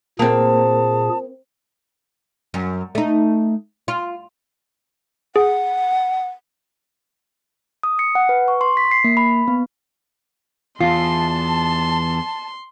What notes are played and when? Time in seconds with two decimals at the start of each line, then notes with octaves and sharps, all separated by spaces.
0.19 A#2 A#3 C4 G#4 A5
2.54 F#2
2.95 A3 D#4
3.88 F4
5.36 G#4 F#5
7.83 D#6
7.99 C#7
8.15 F#5
8.29 B4
8.48 C#6
8.61 C6
8.77 B6
8.91 C7
9.04 A#3
9.17 B5
9.48 B3
10.81 E2 F4 A5 C6